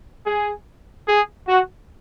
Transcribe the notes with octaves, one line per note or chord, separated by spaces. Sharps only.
G#4
G#4
F#4